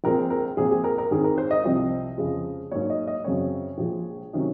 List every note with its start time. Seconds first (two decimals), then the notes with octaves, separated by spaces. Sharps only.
0.04 A#1 A#2 G#3 C4 A#4
0.30 A#4
0.57 A#1 A#2 G#3 C4 G#4
0.71 G#4
0.84 A#4
0.98 A#4
1.11 G#2 D#3 G#3 C4 G#4
1.24 A#4
1.38 C5
1.51 D#5
1.64 C2 C3 F3 C4 D#5
2.18 F2 C#3 F3 G#3
2.71 G#2 F#3 A#3 C#5
2.90 D#5
3.07 D#5
3.24 F#2 C#3 F#3 C4 C#5
3.78 A#1 A#2 F3 G#3
4.33 C3 D#3 F#3 C#4